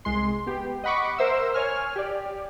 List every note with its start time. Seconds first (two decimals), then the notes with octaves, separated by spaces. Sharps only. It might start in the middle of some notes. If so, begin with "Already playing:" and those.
0.05 C2 G#3 C6
0.46 B3 G4
0.84 D#5 F#5 B5 C#6 D6
1.18 A#4 C5 E5 E6
1.54 C#5 G#5 F6
1.96 G4 D5